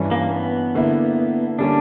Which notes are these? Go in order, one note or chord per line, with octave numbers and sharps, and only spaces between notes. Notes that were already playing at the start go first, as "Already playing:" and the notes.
Already playing: G2 E3 G3 C#4
A#3
B3
D3 A#3 E4
D3 G3 A#3 C#4 D4